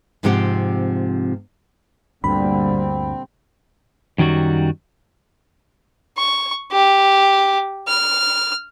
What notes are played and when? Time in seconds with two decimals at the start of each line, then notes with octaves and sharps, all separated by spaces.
0.23 G#2 C3 F3 C4 G4 F#5
2.24 D2 G2 A#2 D3 G3 C4 B5
4.18 F#2 D#3 F#3 G3 F#4
6.18 C#6
6.72 G4
7.88 F6